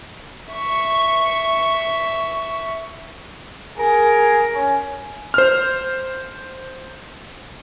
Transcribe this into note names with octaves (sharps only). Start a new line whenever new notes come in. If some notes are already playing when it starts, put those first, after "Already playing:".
E5 C#6
G#4 A#4
C#4
C5 F6